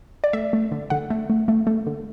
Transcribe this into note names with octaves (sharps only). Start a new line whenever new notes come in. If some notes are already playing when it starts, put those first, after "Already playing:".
D5
A3 E5
A3
D3
D3 F#5
A3
A3
A3
A3
D3